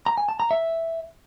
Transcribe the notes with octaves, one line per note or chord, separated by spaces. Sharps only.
A#5
G#5
A5
A#5
E5